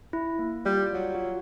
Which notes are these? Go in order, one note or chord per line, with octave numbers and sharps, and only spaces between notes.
E4
A#3
G3 F4 D5
F#3
F4 F#4